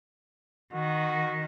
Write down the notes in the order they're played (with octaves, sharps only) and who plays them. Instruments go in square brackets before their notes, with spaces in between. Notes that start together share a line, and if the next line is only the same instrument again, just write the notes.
[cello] D#3 [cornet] F#4